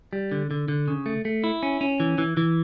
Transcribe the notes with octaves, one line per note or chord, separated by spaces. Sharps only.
G3
D3
D3
D3
C#3
A3
A3
E4
C#4
C#4
E3
E3
E3